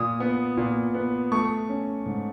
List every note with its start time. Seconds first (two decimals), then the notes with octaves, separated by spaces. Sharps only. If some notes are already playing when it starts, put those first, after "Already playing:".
Already playing: A#2 D#6
0.20 B3
0.57 A#2
0.94 B3
1.32 A3 C#6
1.69 C#4
2.06 G#2